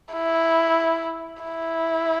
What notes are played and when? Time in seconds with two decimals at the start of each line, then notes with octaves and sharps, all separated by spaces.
0.13 E4
1.43 E4